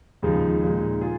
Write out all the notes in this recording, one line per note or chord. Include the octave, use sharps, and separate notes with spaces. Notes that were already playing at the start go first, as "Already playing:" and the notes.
D#2 C#3 F3 G#3 D#4
A#2 G#3 D#4
F4 G#4